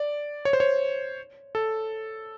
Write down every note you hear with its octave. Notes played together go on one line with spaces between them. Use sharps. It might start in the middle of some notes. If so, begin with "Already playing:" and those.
Already playing: D5
C#5
C5
C#5
A4